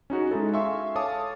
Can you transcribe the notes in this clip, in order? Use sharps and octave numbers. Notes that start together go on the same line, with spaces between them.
C#4 D#4 F#4 G#4
G#3 C#4 D#4 E4 A4
E5 F5 G#5 C6 C#6 E6
A4 C#5 F5 A5 D6 D#6